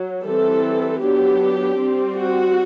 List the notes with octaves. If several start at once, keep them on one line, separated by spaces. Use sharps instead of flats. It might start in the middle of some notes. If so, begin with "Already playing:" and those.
Already playing: F#3
E3 G3 C4 A4
F#3 B3 D4 G4
G3 C4
F#4